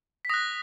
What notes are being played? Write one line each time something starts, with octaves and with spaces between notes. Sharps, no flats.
B6
D#6 F#6 A#6